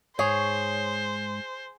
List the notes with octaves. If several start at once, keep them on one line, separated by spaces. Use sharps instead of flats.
G#2 G#4 C5 C#5